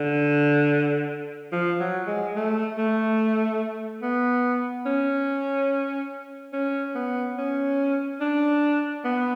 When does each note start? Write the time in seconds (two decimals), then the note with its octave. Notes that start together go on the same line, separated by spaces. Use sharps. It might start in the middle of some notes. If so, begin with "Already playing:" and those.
Already playing: D3
1.52 F3
1.80 F#3
2.07 G#3
2.36 A3
2.78 A3
4.02 B3
4.86 C#4
6.53 C#4
6.95 B3
7.38 C#4
8.21 D4
9.05 B3